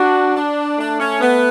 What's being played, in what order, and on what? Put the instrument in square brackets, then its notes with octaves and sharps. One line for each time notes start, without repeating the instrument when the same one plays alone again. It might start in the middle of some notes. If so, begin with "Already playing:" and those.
Already playing: [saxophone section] D4 [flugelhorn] F#4
[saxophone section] D4
[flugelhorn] A3 [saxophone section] D4
[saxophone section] C#4
B3